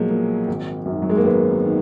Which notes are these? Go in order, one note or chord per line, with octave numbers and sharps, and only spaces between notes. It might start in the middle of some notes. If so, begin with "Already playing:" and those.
Already playing: B1 A#2 F3 F#3 G#3 A#3
A#2
G#1
F#2
D#3
F#3
G#3
A#3
G#1 B3
D#3